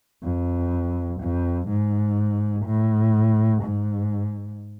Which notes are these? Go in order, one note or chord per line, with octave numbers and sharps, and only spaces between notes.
F2
F2
G#2
A2
G#2